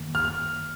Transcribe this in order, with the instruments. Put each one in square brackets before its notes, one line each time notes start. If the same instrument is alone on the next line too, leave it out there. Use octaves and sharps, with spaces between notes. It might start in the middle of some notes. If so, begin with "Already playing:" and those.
Already playing: [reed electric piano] F#2 D#3 A#3
[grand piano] F6
F6